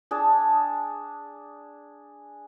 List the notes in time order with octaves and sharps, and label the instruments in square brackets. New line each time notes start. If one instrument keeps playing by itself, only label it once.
[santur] D4 G#4 D5 A5